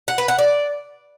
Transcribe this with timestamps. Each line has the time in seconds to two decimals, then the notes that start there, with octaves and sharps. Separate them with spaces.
0.08 F#5
0.18 B4
0.28 F#5
0.38 D5